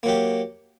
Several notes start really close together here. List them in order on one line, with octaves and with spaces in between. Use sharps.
A#3 F#3 G4